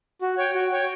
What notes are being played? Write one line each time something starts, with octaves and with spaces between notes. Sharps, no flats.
F#4
C#5 G5
F#4
C#5 G5